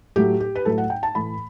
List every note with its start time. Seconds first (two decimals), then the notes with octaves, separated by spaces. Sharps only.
0.16 A2 F#3 A3 G4
0.40 G4
0.55 B4
0.65 A2 F#3 A3 A4
0.78 F#5
0.90 G5
1.03 A5
1.15 A2 E3 A3 B5